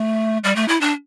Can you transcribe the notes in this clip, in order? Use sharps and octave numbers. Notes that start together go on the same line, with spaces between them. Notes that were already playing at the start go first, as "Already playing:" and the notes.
Already playing: A3
G3
A3
E4
D4